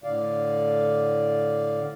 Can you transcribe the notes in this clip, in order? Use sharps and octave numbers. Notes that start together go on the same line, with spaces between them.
A2 D3 D5 F5